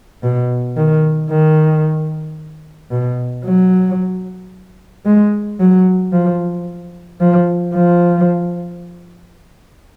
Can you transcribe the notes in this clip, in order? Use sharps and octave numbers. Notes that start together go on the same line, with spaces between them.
B2
D#3
D#3
B2
F#3
G#3
F#3
F3
F3
F3